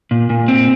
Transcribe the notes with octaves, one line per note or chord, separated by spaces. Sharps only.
A#2
A#2
C4